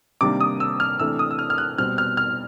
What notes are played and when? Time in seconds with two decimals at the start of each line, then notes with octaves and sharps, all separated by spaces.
0.21 C3 D#3 G3 A#3 D4 D6
0.40 D#6
0.60 E6
0.80 F6
0.99 C3 E3 A3 D4 E6
1.19 D#6
1.31 E6
1.39 F6
1.50 F6
1.58 F#6
1.78 B2 G3 C4 F6
1.98 F6
2.17 F6